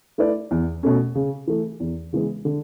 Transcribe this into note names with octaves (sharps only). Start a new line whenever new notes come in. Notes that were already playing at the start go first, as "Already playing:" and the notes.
A3 E4 B4 D5
E2
B2 A3 C#4
C#3
E3 A3
E2
C#3 E3 G#3 B3
D3